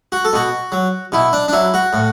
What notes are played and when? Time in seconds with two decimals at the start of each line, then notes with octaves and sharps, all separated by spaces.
0.12 F#4
0.25 A4
0.33 B2 F#4
0.72 F#3
1.12 B2 E4
1.33 D4
1.48 D4
1.53 F#3 E4
1.74 F#4
1.93 A2